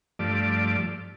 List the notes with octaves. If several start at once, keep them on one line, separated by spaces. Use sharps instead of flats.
G2 F3 A3 D5